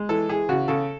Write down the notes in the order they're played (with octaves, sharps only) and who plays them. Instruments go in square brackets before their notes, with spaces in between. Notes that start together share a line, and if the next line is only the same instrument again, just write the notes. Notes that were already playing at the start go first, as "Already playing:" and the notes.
Already playing: [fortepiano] G#3
E3 A4
E3 G#4
C#3 F#4
C#3 A4